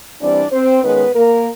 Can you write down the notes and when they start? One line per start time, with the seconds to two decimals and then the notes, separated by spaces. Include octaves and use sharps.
0.21 E3 G3 C4 D4 D5
0.52 C4 C5
0.83 D#3 G#3 B3 C#4 B4
1.15 A#3 A#4